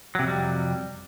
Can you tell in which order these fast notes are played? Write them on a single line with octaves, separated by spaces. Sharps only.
F#3 C3 F2 G3